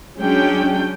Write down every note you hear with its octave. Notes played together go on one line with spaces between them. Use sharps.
F#3 G#3 C#4 D4 G5